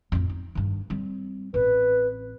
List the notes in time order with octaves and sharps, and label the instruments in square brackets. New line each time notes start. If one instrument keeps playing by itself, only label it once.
[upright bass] A1 F2
D#4
G2 D#3
G3 C4
[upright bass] A1 C4 [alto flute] B4